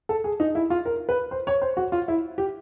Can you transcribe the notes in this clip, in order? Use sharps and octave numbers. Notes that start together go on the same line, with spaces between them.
A4
G#4
D#4
E4
F4
A#4
B4
C5
C#5
C5
F#4
F4
E4
G4